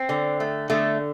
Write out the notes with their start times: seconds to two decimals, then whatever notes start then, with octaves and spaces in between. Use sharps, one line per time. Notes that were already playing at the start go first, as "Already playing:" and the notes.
Already playing: C4
0.09 D3
0.40 A3
0.70 D3 A3